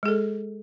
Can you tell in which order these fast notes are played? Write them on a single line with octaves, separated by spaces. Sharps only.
G#3 G#4 A4